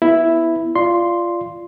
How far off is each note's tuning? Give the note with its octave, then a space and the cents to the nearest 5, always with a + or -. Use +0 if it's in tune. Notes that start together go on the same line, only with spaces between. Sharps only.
B3 +0 E4 +0
F4 -15 D5 +0 C6 +0